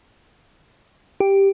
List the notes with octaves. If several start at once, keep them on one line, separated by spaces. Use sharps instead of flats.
G4